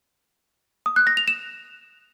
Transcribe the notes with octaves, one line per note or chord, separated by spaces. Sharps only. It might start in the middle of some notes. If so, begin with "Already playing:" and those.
D#6
F#6
A#6
F7
E7